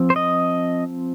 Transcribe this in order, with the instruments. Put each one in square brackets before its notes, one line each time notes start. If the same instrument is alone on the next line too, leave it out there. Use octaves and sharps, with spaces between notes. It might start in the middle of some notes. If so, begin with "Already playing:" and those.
Already playing: [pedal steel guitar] F3 C4
C5
D#5